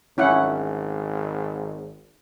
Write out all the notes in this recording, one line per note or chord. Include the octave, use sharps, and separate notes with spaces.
G#1 C#4 E4 F#5